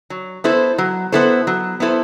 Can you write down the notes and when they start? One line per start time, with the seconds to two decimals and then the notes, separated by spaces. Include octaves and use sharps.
0.10 F#3
0.44 B3 E4 A4 C5
0.78 F#3
1.12 B3 E4 A4 C5
1.47 F#3
1.80 B3 E4 A4 C5